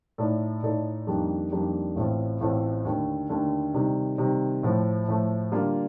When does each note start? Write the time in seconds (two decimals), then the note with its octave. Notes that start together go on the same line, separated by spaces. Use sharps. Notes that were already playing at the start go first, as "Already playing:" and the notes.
0.18 A2 A3 D#4 A4 D5
0.63 A2 A3 D#4 A4 D5
1.07 F2 D#3 G3 A#3 D4
1.52 F2 D#3 G3 A#3 D4
1.96 A1 A2 A3 C4 F4
2.41 A1 A2 A3 C4 F4
2.85 D#2 D3 A3
3.29 D#2 D3 A3
3.74 C3 D#3 G3
4.18 C3 D#3 G3
4.63 A2 F3 A3
5.08 A2 F3 A3
5.51 D3 G3 A#3 F4